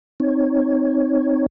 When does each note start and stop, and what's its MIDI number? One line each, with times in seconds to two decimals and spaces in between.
0.20 1.46 60
0.20 1.46 63
0.20 1.46 73